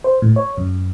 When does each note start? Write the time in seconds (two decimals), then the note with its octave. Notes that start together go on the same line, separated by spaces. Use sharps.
0.04 C5
0.22 A2
0.36 C#5
0.57 F#2